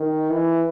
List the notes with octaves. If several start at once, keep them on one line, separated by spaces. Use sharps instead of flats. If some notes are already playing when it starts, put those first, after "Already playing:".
Already playing: D#3
E3